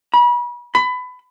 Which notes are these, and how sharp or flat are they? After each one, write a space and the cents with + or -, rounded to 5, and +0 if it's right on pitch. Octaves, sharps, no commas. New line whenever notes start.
B5 -35
B5 +25